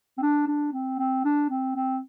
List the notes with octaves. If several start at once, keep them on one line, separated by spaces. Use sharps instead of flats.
C4
D4
D4
C4
C4
D4
C4
C4